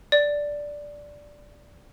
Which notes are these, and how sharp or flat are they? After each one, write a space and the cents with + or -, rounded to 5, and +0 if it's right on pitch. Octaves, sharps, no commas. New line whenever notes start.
D5 -5